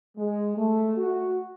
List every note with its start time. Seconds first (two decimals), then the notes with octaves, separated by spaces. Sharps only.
0.18 G#3
0.58 A3
0.97 F#4